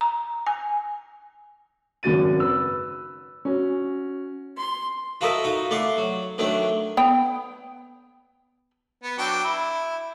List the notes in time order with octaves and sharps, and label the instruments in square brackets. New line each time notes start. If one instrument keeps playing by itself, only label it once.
[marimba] A#5
G#5
[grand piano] G#1 F#2 C#3 F#4 A6 D#7
B4 E6
C#4 F#4
[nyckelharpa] C6
[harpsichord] F4 F#4 A4 A#4 D#5 E5
D#4 F4 F#4
A3 D5 F#5 C6
F#3
D#3 F#3 A3 D4
[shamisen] B3 G5
[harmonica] B3
F#3 D4 G5
E4